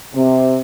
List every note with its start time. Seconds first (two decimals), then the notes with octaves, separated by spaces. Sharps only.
0.14 C3